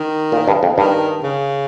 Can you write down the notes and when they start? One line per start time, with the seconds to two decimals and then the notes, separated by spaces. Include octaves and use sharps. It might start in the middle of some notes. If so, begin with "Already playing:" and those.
Already playing: D#3
0.32 A#2
0.48 G2
0.63 F2
0.78 G2 D#3
1.24 C#3